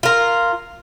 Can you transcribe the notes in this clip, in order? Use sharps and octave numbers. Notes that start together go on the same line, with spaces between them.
F4 A#4